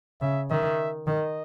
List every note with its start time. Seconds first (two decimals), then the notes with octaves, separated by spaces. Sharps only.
0.21 C#3 E5
0.50 D#3 E5
1.07 D#3 D#5